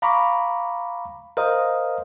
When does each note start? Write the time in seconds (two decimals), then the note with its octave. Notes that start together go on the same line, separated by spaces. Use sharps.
0.02 F5 A#5 B5 C#6 D6
1.37 A#4 C5 D#5 F5 D#6